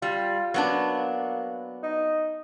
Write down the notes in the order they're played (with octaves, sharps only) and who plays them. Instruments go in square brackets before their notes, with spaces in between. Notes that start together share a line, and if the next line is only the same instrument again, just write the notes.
[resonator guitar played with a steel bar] G3 [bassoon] F4
[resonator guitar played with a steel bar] F#3 B3 D4 [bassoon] A#3
[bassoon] D#4